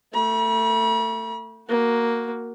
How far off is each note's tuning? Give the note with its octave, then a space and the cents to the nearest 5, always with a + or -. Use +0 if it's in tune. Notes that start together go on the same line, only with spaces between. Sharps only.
A3 +25 B5 -40
A#3 +0 F#4 +0